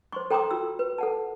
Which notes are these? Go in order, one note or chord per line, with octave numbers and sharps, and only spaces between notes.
C5 C6 C#6
A4 G5 A#5 C6 D6 D#6
F4 F#4 E6
B4
A4 F#5 A5